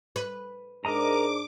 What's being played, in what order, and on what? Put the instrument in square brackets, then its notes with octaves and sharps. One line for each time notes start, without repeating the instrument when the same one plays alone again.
[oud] B4
[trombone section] G#2 D4 [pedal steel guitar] A#4 D#5 A#5 [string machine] D6